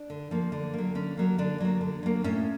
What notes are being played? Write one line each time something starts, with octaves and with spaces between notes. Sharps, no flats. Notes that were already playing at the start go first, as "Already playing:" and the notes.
Already playing: D4
D3
F3 A#3
D3
F#3 A#3
D3 C#4
F#3 A#3
D3 D4
F#3 A#3
D3
F#3 A#3
A2 C#4